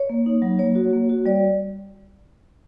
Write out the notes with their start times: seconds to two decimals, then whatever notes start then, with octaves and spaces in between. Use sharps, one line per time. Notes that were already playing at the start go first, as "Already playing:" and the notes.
Already playing: C#5
0.10 A#3
0.26 D#4
0.42 F#3
0.59 A#3 C#5
0.75 F#4
0.93 A#3
1.09 F#4
1.26 G3 D5